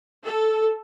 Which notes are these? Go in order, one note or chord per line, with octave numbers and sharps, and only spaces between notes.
A4